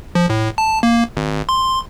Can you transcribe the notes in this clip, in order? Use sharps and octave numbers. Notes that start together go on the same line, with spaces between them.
F3
A2
A5
A#3
G#1
C6